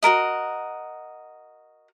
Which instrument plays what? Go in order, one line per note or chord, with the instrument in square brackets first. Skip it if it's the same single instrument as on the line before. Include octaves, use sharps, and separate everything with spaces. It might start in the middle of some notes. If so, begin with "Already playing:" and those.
[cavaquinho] F#4 A4 A#4 D#5